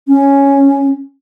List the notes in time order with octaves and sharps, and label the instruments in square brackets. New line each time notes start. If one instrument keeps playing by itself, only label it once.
[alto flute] C#4